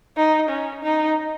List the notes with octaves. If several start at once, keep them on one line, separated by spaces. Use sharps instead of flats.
D#4
C#4
D#4